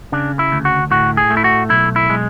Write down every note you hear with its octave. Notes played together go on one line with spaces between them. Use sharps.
C#3 D4
E4
D2
F#4
A2 F#4
G#4
A3
E4
F#4
B1 E4
E4
G#3